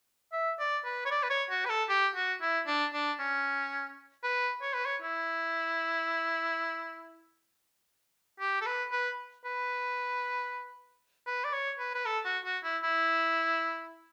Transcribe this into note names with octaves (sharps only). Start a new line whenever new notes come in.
E5
D5
B4
C#5
D5
B4
C#5
F#4
B4
A4
G4
F#4
E4
D4
D4
C#4
B4
C#5
B4
C#5
E4
G4
A4
B4
B4
B4
B4
D5
C#5
B4
B4
A4
F#4
F#4
E4
E4